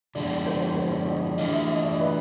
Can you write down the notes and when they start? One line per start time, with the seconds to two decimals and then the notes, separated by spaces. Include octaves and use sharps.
0.15 D3 F3 G#3 B3 D5
0.46 C5
0.61 C#5
0.77 C5
0.92 D5
1.07 D#5
1.38 E3 A3 D4 F4 D#5
1.53 E5
1.68 D#5
1.84 D5
2.00 B4